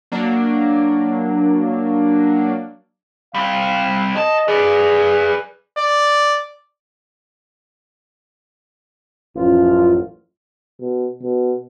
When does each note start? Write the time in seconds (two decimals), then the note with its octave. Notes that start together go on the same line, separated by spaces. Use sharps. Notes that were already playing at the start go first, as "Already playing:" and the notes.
0.12 F#3 A#3 D4
3.35 G3 C4 F5
4.16 G#4 D#5 A5
4.48 G#4 B4 D5
5.78 D5
9.36 A1 F#2 F3 F4
10.81 B2
11.23 B2